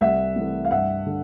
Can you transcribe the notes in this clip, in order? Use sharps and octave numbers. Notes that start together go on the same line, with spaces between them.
C2 E5 F#5
C3 E3 A3
F5
G2 E5 F#5
D3